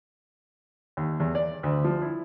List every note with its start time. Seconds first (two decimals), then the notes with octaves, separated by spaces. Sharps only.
0.97 D#2
1.20 E2
1.35 D5
1.63 D2
1.84 F3
2.02 E4